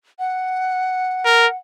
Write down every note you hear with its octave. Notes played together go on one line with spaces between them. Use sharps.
F#5
A#4